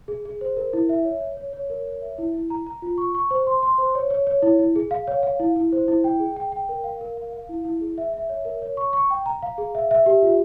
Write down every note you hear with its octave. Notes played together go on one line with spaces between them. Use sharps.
G#4
G#4
C5
A#4
E4
E5
C#5
C#5
C#5
C#5
A#4
C#5
E5
E4
E4
A#5
A#5
F4
C#6
C#6
C5
C6
C6
C5
C#5
C#5
C#5
E4
E4
G#4
F5
C#5
F5
E4
E4
C5
E4
G5
G#4
G5
G5
A#4
F5
A#4
F5
F5
E4
E4
G#4
E5
E5
C#5
A#4
C#5
C#6
C#6
G5
A#5
F5
G#4
E5
E5
G4
F4